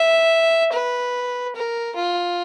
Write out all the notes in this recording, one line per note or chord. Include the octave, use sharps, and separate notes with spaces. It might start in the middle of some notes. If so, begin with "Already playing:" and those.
Already playing: E5
B4
A#4
F4